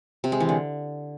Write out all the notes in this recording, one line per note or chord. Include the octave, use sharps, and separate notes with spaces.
C3
G#3
E3
D3